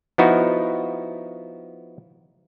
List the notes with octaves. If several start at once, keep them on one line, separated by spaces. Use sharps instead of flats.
F3 B3 D#4 E4 F#4